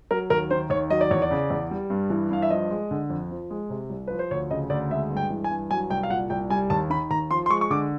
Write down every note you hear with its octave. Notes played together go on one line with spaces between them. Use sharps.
F#3 A#4
D#2 A#4
D#3 C5
D#2 C#5
F#3 D#5
D5
E2 C#5
D5
C#3
E2
G3
G2
E3
G2 F5
E5
F3 D#5
G#3
D3
F2
F3
G#3
C3
C2
F3 B4
C5
D2 C#5
C#3 D#5
D2 D5
G#3 E5
G2
G5
E3
G#5
G2
F#3 G#5
C2 G5
F5
A#2 F#5
C2 G5
G3 G#5
D#2 A5
D#3 B5
D#2 A#5
F3 C6
C6
G#3 C#6
C#6
D3 D6